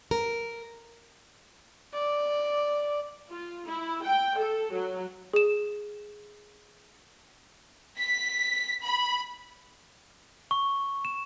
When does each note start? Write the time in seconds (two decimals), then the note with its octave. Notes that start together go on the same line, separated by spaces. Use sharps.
0.11 A#4
1.93 D5
3.31 F4
3.67 E4
4.03 G5
4.37 A4
4.73 F#3
5.33 G#4 E7
7.97 B6
8.83 B5
10.51 C#6
11.05 E7